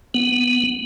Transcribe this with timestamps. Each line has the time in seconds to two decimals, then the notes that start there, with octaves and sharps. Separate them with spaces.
0.14 B3